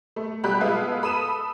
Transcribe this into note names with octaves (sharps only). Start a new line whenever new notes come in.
A3
B2 F#3 G3 G4 B5 F#6
G#3 B3 F4 A4
A4 B5 D#6 D#7 E7